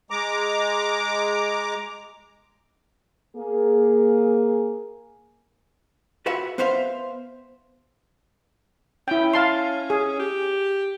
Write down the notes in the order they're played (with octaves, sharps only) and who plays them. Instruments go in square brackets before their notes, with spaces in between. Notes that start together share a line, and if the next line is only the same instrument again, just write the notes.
[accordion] G#3 A#5 D6
[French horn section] A#3 G#4
[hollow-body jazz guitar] F4 F#4 B4 E5 F#5
B3 B4 C5 E5 F5
[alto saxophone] C#4 [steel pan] E4 G5
[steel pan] F5 A5 C6
G#4
[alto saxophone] G4